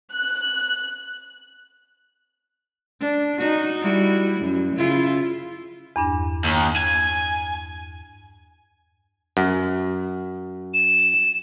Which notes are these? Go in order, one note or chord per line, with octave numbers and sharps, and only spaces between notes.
F#6
D4
D#4 F#4
G3 E4 F#4
F#2
C#3 E4 F4
E2 G2 D4
D#2
G#5
F#2
E7